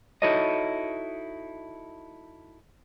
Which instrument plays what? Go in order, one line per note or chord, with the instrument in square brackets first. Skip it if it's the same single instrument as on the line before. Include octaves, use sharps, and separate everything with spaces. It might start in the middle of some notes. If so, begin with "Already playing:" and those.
[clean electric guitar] D#4 E4 F#4 A4 C#5 D#5